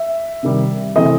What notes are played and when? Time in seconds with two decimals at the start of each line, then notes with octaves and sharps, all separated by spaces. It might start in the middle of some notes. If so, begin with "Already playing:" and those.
Already playing: E5
0.43 C3 D#3 G3
0.96 C3 E3 A3 C4 D#5